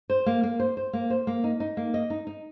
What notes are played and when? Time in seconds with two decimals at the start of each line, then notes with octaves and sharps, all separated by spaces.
0.10 C5
0.26 A#3
0.43 A#3
0.59 C5
0.77 C5
0.93 A#3
1.10 C5
1.27 A#3
1.44 D#4
1.60 D#4
1.77 A#3
1.94 D#5
2.10 D#4
2.27 D#4